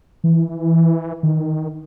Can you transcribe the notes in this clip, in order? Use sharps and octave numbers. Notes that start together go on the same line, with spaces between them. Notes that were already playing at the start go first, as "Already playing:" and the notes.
E3
D#3